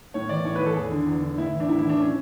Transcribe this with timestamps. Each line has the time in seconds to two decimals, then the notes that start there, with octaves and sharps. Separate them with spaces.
0.14 A2 C#5
0.29 E3 D5
0.45 A2 C#5
0.56 E3 B4
0.66 A4
0.76 E2 G#4
0.91 D3
1.07 E2
1.22 D3
1.37 A2 E4
1.53 E3
1.60 D4
1.68 A2 E4
1.79 E4
1.84 E3 D4
2.00 C#4